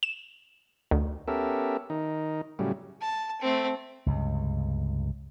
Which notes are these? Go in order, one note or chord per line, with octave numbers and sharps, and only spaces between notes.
E7
D2
B3 C#4 G4 A4 A#4 E5
D#3 D#4
A2 C#3 F#3 G3
A5
A3 C4
C#2 G2 C3